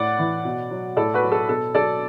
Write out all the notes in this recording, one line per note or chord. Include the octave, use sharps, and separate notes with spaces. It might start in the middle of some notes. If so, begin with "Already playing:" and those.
Already playing: A2 D5 F#5
E3
B2
F#3
A2 A4 D5
F#4 B4
F#3
A4
B2 A4
F#3 A4 D5